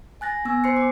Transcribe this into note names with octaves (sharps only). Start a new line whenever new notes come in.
G#5 F#6 A6 A#6
B3 G#5 E6
C5 C6 C7 C#7
D6